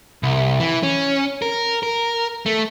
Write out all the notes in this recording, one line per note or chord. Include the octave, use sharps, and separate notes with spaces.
C2
E3
C#4
A#4
A#4
A3